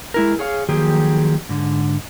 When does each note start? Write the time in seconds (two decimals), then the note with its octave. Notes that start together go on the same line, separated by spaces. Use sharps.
0.14 G#3 E4 A#4
0.39 G#4 C#5 F5
0.69 D#3 F3 F#3 A#3 G4 G#4
1.49 G#2 D3